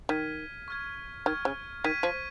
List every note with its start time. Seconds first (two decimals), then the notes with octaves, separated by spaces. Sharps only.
0.09 D#3 F6 G#6 B6 D#7
0.68 C#6 F6 G#6
1.26 D#3 C#6 F6 G#6
1.45 C#3
1.84 D#3 G#6 B6 D#7
2.03 F3